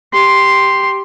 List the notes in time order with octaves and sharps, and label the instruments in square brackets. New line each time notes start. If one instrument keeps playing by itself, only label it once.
[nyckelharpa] G4 C6